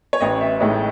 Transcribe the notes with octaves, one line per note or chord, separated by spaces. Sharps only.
C#5
A1 D#5
E5
A2 G#3 D#4 C#5